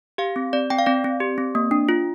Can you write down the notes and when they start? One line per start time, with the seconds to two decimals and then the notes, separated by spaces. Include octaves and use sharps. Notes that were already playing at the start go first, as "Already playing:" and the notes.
0.18 G4 F5
0.36 C4
0.53 C4 D5
0.70 C4 G5
0.79 F5
0.86 C4 D5
1.04 C4
1.20 G4
1.38 C4
1.55 A#3
1.71 D4
1.89 F4